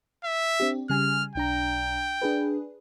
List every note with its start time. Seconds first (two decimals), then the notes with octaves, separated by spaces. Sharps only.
0.24 E5
0.60 C4 D4 G4
0.90 C#3 G3 G#5 F6
1.35 B1 D4 G5 A#5
2.22 D4 G#4 B4